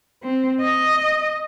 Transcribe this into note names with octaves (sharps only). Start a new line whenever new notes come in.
C4
D#5